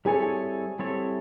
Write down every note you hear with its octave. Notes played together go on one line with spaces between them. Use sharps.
G3 C4 E4 G#4 A4 C#5 G#5
G3 C4 E4 A4 C#5